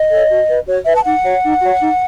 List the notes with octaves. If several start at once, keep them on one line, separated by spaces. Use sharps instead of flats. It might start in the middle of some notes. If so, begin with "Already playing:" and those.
Already playing: D#5
A4 C#5
F#4
B4
F#4 C#5
B4 E5
A5
D#4 F#5
F#4 C#5
D#4
F#4 C#5
D#4